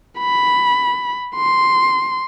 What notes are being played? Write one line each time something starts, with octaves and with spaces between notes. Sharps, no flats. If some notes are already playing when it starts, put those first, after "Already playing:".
B5
C6